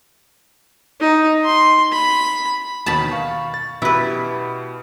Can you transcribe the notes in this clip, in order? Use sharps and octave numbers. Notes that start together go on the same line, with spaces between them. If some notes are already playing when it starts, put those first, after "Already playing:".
D#4
C6
B5
D#2 B2 D#3 A5 B5
F5 C#6
A6
B2 E4 G4 B4